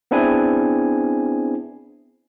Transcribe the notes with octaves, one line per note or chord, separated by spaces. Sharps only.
B3 C4 D4 E4 G#4 G#5